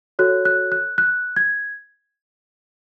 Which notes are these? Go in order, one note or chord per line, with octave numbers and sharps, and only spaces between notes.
F#4 A4 C#5 F#6
F#6
F#6
F#6
G#6